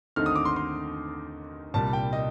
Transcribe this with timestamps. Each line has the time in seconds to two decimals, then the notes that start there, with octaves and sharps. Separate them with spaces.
0.16 D#2 D3 A3 C4 D#4 F6
0.26 D#6
0.35 D6
0.45 C6
0.56 C6
1.74 C2 A#2 G3 A5
1.93 G5
2.13 D#5